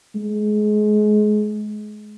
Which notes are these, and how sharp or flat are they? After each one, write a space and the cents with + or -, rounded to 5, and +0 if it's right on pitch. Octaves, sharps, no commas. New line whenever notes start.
G#3 +25